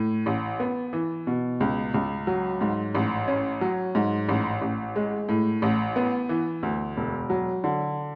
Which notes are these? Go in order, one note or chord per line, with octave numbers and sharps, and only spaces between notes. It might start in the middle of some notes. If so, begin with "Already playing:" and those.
Already playing: A2
A1
B3
E3
B2
C#2
C#2
F#3
G#2
A1
C#4
F#3
G#2
A1
A1
G#3
A2
A1
B3
E3
D2
E1
F#3
D3